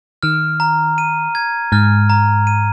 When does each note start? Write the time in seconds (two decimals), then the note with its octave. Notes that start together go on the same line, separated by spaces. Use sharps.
0.23 D#3 F6
0.60 A#5
0.98 D#7
1.35 G#6
1.72 G#2 F6
2.10 A#5
2.47 D#7